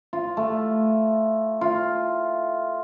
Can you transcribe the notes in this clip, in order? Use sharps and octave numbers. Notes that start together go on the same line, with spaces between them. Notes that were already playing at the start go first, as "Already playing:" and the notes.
F4
A3
F4